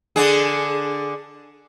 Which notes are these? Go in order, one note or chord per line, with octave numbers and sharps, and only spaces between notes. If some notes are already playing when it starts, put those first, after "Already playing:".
D3 D4 G#4